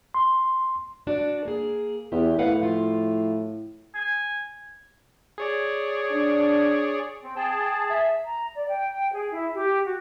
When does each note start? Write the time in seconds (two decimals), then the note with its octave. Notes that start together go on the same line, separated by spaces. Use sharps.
0.14 C6
1.07 D4 F#4 D5
1.45 A#3 G#4
2.12 E2 G4
2.39 A2 B4 F5 F#5
2.59 F3 F4
3.95 G#5
5.38 G#4 C#5 D5
6.12 D4
7.23 C4
7.36 G#4 G5 A5
7.90 E5
8.25 A#5
8.55 D5
8.68 G5
9.13 G#4
9.31 E4
9.55 G4
9.86 F#4